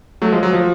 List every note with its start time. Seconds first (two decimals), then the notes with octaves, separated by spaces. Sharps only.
0.22 F#3 A3
0.32 F3 G#3
0.43 F#3
0.53 F3